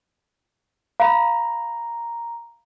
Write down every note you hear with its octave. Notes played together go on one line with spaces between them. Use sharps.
F5 A#5 B5